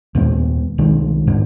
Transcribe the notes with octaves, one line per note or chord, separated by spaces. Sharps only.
D#2 A#2 G#3 B3
C2 B2 D#3 G#3
G#2 B3 D4